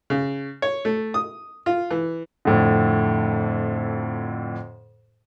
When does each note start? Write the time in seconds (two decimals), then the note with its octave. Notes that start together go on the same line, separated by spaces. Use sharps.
0.10 C#3
0.62 C#5
0.85 A3
1.14 D#6
1.66 F4
1.91 E3
2.45 F2 A2 D3